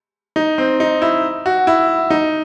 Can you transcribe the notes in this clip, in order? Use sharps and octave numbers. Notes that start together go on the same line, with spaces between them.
D#4
C4
D#4
E4
F#4
E4
D#4